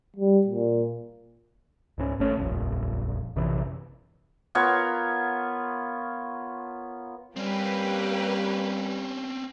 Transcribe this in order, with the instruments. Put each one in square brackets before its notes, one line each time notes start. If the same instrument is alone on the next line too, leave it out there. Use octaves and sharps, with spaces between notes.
[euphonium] G3
A#2
[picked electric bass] C#2 G#2 C#4
G#1 A3 C#4
D#1 A#1 F2
A#1 F#2 C3 E3
[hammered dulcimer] B3 F4 A#4 C#5
[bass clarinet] G3 [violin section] A#3 G4 B4 [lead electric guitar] C4 C#4